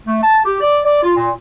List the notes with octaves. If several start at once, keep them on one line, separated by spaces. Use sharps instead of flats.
A3
A5
G4
D5
D5
F4
A#2